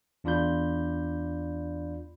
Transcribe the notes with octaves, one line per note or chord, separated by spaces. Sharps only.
E2 D4 F4 D5 B5 G6